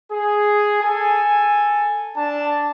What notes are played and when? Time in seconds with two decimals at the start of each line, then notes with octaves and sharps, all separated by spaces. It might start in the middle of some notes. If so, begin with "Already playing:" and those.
0.11 G#4
0.81 A4 G#5
2.15 D4 A5